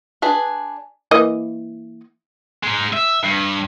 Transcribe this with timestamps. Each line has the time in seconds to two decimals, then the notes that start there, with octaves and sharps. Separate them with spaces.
0.22 D4 G#4 B4
1.11 E3 A#3 D#5
2.63 G#3 D#4
2.93 E5
3.23 G2